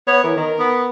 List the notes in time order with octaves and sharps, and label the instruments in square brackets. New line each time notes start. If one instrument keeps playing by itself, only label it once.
[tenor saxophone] B3 [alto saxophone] C#5
[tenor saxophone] E3 [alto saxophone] A#4
[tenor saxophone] D#3 [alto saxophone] A#4
[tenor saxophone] B3